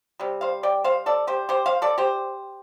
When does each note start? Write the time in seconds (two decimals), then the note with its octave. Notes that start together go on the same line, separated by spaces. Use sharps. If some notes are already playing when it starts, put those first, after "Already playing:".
0.20 C3 G3
0.41 C5 F5
0.63 D5 G5
0.84 C5 F5
1.06 A4 D5
1.27 G4 C5
1.49 G4 C5
1.66 C5 F5
1.82 A4 D5
1.98 G4 C5